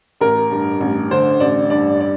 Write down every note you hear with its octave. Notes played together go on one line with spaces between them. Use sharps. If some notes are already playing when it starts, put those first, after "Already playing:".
A1 A#4
G2
A1
D3 C5
A1 D5
G2 D5
D5